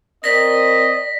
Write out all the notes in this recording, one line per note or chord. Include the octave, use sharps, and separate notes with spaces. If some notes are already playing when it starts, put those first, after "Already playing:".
C4 A#4 D5 D#5 A#6 B6